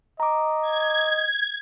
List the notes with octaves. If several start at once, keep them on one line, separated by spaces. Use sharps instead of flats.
D#5 A#5 D6
G#6